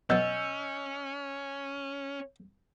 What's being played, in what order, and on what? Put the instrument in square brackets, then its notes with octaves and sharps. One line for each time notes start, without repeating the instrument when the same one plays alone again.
[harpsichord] B2 F#3 [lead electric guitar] C#4 [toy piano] D#5 [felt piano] E6 G6